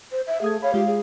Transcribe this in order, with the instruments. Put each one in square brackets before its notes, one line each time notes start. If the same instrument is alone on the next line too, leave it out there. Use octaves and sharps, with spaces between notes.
[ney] C5
E5
[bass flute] A3 [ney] G#4 [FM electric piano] F5 D#6 G#6
[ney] C#5 [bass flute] F5 [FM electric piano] B5
[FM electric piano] G#3 F4 [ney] G4
[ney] G#4